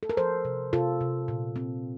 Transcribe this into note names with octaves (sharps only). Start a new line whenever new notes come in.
A4
A#4
F3 A4 C5
C3
C3 F4 A4
C3
A#2
C4